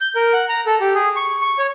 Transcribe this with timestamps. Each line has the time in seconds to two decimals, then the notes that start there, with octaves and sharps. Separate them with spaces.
0.01 G6
0.15 A#4
0.33 F#5
0.49 A#5
0.66 A4
0.81 G4
0.95 G#4
1.16 C#6
1.42 C#6
1.58 C#5